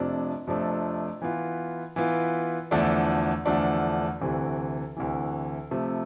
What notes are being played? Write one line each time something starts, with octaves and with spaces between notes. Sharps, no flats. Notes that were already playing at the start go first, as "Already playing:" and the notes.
Already playing: F2 C3 F3 A3 D4
F2 C3 F3 A3 D4
E3 B3 F4
E3 B3 F4
E2 D3 F3 A3 D4
E2 D3 F3 A3 D4
D2 C3 E3
D2 C3 E3
C3 F3 A3